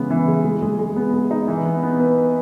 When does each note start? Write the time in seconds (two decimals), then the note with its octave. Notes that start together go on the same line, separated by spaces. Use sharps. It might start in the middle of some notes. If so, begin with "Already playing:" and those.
Already playing: C#3 E3 G#3 B3
0.10 E3
0.28 G#3
0.44 G#3
0.62 G#3
0.79 G#3
0.96 B3
1.14 G#3
1.31 D#4
1.48 E3
1.66 B3
1.83 B3
2.00 B4
2.18 B4